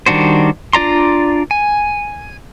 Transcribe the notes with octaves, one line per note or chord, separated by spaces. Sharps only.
D#3 G3 D4 F#4 C5
D4 F4 D5 A#5 C6
G#5